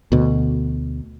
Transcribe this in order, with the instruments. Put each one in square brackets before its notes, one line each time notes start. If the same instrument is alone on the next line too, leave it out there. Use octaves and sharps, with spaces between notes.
[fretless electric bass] D2 B2